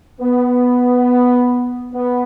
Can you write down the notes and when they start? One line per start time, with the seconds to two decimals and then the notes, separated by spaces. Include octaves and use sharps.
0.21 B3
1.93 B3